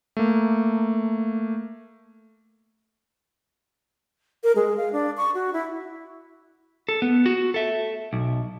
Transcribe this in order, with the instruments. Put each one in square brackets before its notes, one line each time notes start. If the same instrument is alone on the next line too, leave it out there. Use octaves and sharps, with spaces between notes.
[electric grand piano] A3 A#3
[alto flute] A#4
G#3
F5
D4
C#6
F#4
E4
[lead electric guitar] A4
B3
F#4
A4 E5
B1